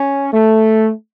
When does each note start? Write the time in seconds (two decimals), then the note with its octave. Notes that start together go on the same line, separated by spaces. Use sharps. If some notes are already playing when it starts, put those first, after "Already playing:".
Already playing: C#4
0.33 A3